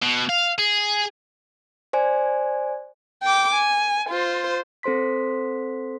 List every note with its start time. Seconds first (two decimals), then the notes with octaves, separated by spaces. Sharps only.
0.02 B2
0.29 F5
0.58 G#4
1.93 C5 D5 G#5
3.23 G5 D6
3.55 G#5
4.09 F4 C5
4.83 C4 A4 C5 C6 B6